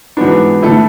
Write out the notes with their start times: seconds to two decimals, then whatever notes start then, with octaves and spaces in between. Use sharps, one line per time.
0.17 G#2 E3 B3 D4 F#4
0.62 D3 A3 E4 A4